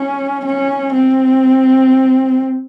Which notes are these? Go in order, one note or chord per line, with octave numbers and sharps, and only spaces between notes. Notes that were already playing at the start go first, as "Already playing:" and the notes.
Already playing: C#4
C#4
C4